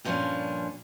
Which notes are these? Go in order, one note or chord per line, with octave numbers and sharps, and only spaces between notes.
G2 A#2 F3 B3 C#4 D4